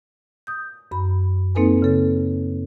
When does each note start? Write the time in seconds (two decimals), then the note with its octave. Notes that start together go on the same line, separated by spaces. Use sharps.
0.47 D#6 G6
0.91 F#2 B5
1.55 A#3 C4 D#4 A4 B4 G#5
1.82 C#3 A4